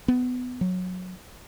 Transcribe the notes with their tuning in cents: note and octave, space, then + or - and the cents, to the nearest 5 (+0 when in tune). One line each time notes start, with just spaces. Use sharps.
B3 +20
F#3 -15